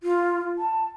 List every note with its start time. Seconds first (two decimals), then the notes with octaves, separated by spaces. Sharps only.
0.03 F4
0.58 A5